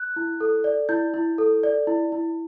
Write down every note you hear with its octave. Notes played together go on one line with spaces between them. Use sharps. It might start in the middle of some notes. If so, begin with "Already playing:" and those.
Already playing: F#6
E4
A4
D5
E4 G6
E4
A4
D5
E4
E4